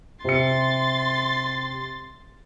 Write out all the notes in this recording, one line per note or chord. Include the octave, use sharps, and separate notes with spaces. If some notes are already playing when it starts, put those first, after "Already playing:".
C3 C6 A6 C#7